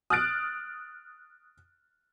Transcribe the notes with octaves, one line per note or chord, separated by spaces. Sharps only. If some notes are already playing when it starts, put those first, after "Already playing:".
D#6 F6 F#6 A6 D7